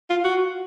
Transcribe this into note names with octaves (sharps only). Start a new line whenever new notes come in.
F4
F#4